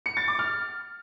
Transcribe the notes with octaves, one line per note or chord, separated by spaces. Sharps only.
C#7
A6
D6
F6